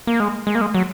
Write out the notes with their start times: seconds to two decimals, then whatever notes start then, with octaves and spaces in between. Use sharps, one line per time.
0.07 A#3
0.20 G#3
0.47 G#3
0.55 A#3
0.61 G#3
0.74 F#3